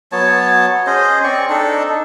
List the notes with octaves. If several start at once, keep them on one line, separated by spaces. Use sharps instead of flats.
F#3 B3 C#5 A5
C#4 G#4 C5 D#5
C4 D5 C#6
D4 D#4 A4